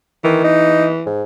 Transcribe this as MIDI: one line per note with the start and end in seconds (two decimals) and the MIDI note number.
0.24 0.44 51
0.24 1.05 52
0.44 0.87 63
1.06 1.23 44